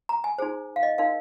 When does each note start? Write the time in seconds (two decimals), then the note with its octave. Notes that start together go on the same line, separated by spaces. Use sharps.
0.09 A#5
0.24 G#5
0.38 D#4 G#4 C5
0.76 F5
0.83 D#5
0.98 D#4 A#4 F5